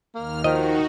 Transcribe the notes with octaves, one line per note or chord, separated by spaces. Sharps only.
D#2 A#3 F6
D#3 F3 D#4 F#4 D#5